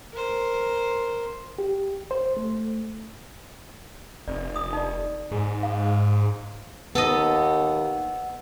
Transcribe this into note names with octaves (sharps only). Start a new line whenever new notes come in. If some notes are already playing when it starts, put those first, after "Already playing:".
A#4 C5
G4
C5
A3
F1 D5
D#6
D#4 D5
G#2
F5
D#2 B3 A4 D#5